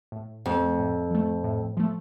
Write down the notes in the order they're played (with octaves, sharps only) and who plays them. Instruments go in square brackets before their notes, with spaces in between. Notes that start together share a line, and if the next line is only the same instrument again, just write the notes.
[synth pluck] A2
[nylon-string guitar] F2 [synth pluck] F3 A3
[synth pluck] A2
F3 A3
A2
F3 A3